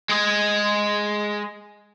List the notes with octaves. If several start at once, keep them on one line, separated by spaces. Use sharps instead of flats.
G#3 G#4